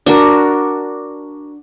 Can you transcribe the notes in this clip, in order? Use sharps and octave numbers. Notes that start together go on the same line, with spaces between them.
D4 F#4 A#4